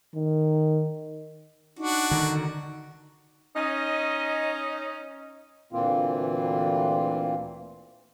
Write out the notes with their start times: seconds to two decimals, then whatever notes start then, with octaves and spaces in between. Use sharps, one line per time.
0.14 D#3
1.79 D4 D#4 F#4
2.11 D3 D#3
3.56 C#4 D#4 D#5
5.73 D2 A#2 E3 A#3 C4 F4